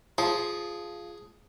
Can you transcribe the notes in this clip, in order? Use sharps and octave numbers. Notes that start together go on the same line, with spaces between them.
F3 G#4